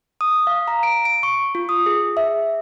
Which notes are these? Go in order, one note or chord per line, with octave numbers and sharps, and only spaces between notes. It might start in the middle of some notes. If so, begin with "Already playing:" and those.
D#6
F5
A#5
D7
D7
C#6
F4
D#6
G#4
E5